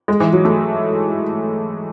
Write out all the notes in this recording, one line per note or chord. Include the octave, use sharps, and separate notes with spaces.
G#3
E3
F#3
A3